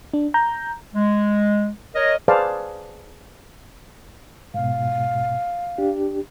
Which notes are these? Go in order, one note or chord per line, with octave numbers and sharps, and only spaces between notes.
D4
A#5 G6
G#3
A#4 C#5 D#5
G#4 B4 C5 D5 F5 A5
G#2 B2 F5
D4 G4